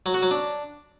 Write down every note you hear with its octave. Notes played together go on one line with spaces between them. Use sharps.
F#3
F#4
F#3
D4